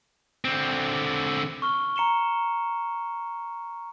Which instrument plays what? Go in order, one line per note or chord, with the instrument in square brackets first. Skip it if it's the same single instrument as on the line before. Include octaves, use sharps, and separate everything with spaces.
[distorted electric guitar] D3 C4
[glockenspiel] C#6 F6 G7
A#5 C#7 E7 G7